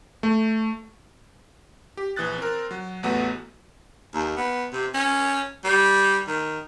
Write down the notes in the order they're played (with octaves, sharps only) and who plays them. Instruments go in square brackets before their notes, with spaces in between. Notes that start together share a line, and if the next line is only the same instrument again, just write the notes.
[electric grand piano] A3
G4
A#1 E3 D#6 F#6 A6
C4 A#4
F#3
A1 E2 A3 B3 F#4
[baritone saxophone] D#2
B3
C3
C#4
G3
D#3